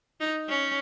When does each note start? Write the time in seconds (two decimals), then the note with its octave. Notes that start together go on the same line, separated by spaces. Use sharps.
0.20 D#4
0.49 C#4